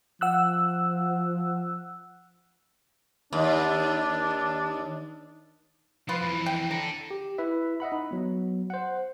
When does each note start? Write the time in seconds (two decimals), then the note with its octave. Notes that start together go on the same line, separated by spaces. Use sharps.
0.21 F3 F#5 E6 F#6
3.33 D#2 D4
6.09 F3 F4 B4
6.22 F2 E3
6.46 G5
6.71 D4 A4 A#5
7.11 G4
7.38 E4 B4 E5
7.80 D#5 E5 F#5 B5
7.92 D#4
8.11 F#3 B3
8.70 C5 F#5